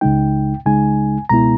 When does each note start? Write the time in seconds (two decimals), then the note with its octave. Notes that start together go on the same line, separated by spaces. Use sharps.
0.01 C#2 C#3 G#3 D#4 G5
0.66 C#2 C#3 G#3 D#4 G#5
1.29 C#2 B2 G#3 B3 E4 A#5